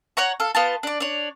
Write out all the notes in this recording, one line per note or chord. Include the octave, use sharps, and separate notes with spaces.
C#5 F#5 A#5 C#6
A4 F5
B3 F4 A5
D4 D5
D4 C#5